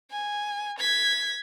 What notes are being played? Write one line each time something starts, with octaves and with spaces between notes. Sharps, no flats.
G#5
G#6 B6